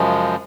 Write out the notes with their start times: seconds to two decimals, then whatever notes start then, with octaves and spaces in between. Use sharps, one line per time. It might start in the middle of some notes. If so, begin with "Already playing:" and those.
Already playing: F#2 C#3 F3 G#3